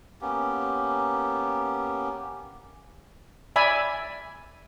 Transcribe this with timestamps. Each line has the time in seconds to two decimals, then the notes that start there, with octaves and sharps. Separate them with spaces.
0.21 A#3 B3 C#4 G4
3.56 D5 E5 G#5 B5